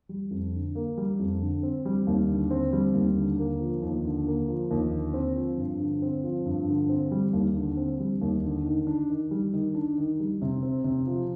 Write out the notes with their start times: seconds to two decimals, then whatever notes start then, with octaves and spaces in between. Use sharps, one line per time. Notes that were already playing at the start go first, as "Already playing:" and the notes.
0.09 G3
0.31 F2
0.54 D3
0.75 A#3
0.97 G3
1.19 F2
1.41 D3
1.63 C4
1.85 G3
2.07 D#2
2.29 D3
2.51 C4
2.73 G3
2.94 D#2
3.16 D3
3.38 A#3
3.60 F3
3.82 D#2
4.05 D3
4.27 A#3
4.48 F3
4.71 D#2
4.93 D3
5.14 C4
5.36 F3
5.58 G2
5.80 D3
6.02 C4
6.23 F3
6.46 G2
6.68 D3
6.89 C4
7.11 G3
7.33 D#2
7.56 D3
7.77 C4
8.00 G3
8.22 D#2
8.44 D3
8.66 D#3
8.87 D4
9.10 D#3
9.31 G3
9.53 D#3
9.75 D4
9.98 D#3
10.20 G3
10.42 C3
10.62 C4
10.84 C3
11.07 F3